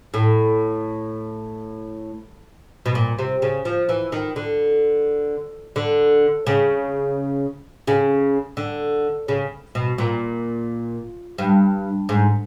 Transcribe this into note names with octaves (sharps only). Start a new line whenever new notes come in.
A2
B2
A#2
C3
C#3
F3
E3
D#3
D3
D3
C#3
C#3
D3
C#3
B2
A#2
G2
G#2